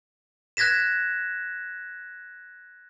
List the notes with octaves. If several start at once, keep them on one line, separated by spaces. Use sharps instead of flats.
F#6 G#6 A#6 B6 E7